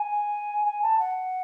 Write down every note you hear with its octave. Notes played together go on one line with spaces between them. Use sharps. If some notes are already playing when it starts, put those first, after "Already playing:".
Already playing: G#5
G#5
A5
F#5